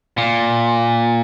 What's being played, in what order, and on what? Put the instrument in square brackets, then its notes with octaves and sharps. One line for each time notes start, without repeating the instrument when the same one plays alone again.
[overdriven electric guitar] A#2